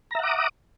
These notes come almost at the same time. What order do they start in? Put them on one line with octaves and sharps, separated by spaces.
A#5 E5 F#5 D6 D#6